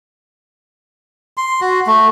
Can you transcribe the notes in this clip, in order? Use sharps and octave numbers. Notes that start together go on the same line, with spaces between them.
C6
F#4
A3